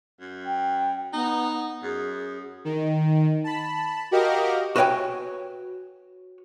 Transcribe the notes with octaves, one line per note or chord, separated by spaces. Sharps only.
F#2
G5
B3 D#4
F#2 G#4
D#3
A5 B5
F#4 G4 A#4 D#5 F5
F#4 B4 C#5 D#5 G5 G#5